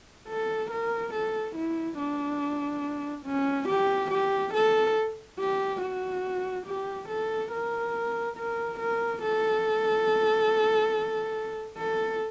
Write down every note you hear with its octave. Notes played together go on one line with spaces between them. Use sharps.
A4
A#4
A4
E4
D4
C#4
G4
G4
A4
G4
F#4
G4
A4
A#4
A#4
A#4
A4
A4